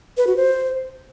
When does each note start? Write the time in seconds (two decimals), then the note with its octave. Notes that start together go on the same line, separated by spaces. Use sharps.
0.17 B4
0.27 F#4
0.37 C5